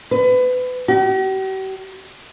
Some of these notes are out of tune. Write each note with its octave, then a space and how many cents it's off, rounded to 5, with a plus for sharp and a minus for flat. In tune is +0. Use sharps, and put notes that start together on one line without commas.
B4 +30
G4 -45